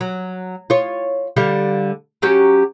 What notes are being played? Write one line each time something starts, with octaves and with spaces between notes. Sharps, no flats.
F#3
F4 C#5
D3 G3 F5
F#3 C#4 G4